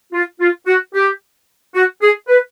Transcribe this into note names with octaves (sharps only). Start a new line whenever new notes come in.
F4
F4
F#4
G4
F#4
G#4
B4